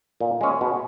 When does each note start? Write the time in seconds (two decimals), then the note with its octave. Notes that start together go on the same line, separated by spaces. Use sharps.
0.20 A#2
0.41 G#3 C#4
0.61 B2